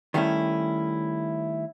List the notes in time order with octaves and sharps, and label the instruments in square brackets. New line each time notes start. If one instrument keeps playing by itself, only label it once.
[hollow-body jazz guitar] D#3 G3 A3 C#4 E4